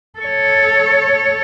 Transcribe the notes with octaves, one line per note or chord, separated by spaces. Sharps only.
A4 C#5